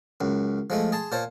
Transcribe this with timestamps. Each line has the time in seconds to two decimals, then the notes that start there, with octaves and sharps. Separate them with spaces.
0.21 C#2 F#2
0.70 F3 G#3 A3
0.92 G#4 A5 C6
1.12 A#2 C5 C#5 A5